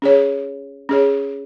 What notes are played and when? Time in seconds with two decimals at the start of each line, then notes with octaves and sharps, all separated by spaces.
0.02 C#4 G#4 C#5
0.89 C#4 G#4 C#5